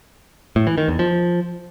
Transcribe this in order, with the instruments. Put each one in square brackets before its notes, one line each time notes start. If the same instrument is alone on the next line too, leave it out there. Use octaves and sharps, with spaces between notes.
[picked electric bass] A2
E3
D#3
E2
F3